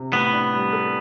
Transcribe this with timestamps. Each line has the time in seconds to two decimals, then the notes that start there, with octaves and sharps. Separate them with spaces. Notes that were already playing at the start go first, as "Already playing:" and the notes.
Already playing: C3
0.13 A2 B3
0.33 D4
0.53 G3
0.73 A4